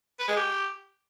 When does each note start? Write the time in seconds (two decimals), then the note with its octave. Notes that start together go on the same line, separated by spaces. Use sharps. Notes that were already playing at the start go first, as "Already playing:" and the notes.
0.19 B4
0.28 G#3
0.37 G4